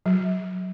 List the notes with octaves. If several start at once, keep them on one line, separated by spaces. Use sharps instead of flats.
F#3